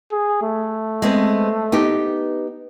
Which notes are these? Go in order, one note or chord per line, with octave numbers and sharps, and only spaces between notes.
G#4
A3
G#3 B3 C4
B3 D#4 G4